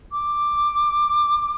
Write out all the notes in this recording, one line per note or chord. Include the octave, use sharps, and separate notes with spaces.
D6